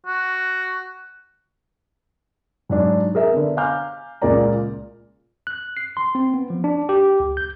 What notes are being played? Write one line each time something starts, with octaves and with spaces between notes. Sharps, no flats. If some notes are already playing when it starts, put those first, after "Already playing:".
F#4
G#2 F#3 D4 D#4
G#4 A#4 E5
D3 B3
F5 G#5 A#5 D6 F6 G6
C#2 A#2 G#3 A#3 D5 A#5
F#6
C7
C6
C4
B3
F3
D4
G4
C#2
G6